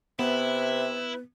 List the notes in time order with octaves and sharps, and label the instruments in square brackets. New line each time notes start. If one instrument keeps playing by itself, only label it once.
[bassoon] C3 [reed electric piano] B3 [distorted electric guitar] E4 [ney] B4